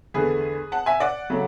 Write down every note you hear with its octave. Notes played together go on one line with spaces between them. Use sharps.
E2 D3 A3 G#4 B4
F#5 A5
E5 G#5
D5 F#5
C#3 F#3 A3